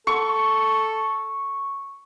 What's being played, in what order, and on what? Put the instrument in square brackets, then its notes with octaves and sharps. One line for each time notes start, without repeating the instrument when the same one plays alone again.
[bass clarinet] A4 [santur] C#6